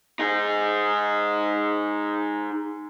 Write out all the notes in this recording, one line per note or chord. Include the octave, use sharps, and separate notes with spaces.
D#4 G#4